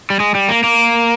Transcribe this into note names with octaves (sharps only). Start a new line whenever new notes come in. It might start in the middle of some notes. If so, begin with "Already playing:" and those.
G3
G#3
G3
A#3
A#3